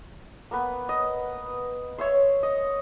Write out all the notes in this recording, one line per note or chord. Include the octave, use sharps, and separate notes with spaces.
A#3 B3 B4
D#5
C#5 E5 C6
D#5